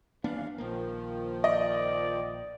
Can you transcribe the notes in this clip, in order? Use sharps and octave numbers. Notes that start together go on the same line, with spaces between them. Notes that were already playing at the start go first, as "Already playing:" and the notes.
D#2 E3 A#3 B3 D4 F5
A#1 D#3 F3 A#3
D5 D#5